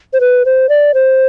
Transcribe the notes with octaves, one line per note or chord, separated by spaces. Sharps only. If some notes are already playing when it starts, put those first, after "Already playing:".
C5
B4
C5
D5
C5